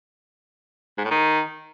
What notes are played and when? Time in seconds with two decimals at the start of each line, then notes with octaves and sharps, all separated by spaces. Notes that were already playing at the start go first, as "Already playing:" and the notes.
0.98 G#2
1.04 A2
1.11 D#3